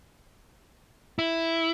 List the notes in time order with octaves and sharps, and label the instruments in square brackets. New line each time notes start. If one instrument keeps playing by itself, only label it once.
[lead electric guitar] E4